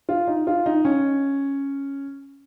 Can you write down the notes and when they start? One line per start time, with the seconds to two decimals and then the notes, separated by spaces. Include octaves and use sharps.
0.09 F4
0.27 D#4
0.47 F4
0.66 D#4
0.85 C#4